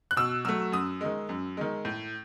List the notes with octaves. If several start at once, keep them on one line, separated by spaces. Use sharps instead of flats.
F#6
B2 E6
F#3 A3 E6
F#2 D#6
D#3 G#3
F#2
D#3 G#3
A2